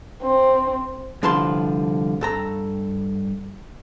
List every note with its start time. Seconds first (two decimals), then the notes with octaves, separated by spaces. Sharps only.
0.23 C4
1.23 C2 D3 F3 B4 A5 C6
2.21 G2 A4 A#5